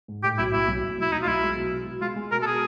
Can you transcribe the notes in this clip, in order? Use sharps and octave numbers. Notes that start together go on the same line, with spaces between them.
G#2
A2 G4
B1 E4
B1 E4
B1
B1
B1 E4
B1 D#4
F4
B1 E4
G#3
B2
B2
B2
G#3 F4
G#3
B2 A#4
A4
B2 G#4